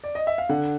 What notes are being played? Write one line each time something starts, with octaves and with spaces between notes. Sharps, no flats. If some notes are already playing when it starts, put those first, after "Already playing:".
D5
D#5
E5
F5
D3 F#5